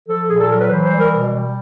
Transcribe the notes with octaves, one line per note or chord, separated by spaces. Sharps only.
F3 A4
A#2 G#4
A4
F#3 A#4
B4
E3 C5
C5
G3
A#4
B2
G3